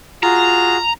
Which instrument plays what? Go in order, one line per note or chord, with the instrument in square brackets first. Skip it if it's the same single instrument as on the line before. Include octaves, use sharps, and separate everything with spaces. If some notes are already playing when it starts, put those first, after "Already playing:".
[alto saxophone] F4 [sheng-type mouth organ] F#4 G#4 [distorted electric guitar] A#5